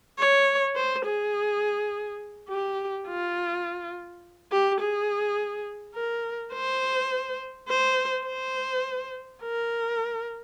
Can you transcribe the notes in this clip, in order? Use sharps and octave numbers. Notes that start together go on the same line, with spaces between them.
C#5
C5
G#4
G4
F4
G4
G#4
A#4
C5
C5
C5
A#4